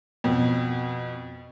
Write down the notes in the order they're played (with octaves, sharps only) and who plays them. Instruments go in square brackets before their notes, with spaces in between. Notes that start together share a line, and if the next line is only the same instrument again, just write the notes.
[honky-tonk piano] F2 B2